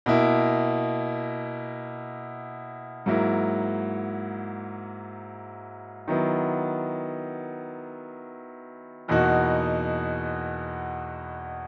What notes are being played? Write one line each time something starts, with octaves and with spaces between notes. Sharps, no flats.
B2 A#3 E4
G#2 F#3 A#3 E4
D#3 F#3 B3 E4
E2 B2 A#3 D#4 F#4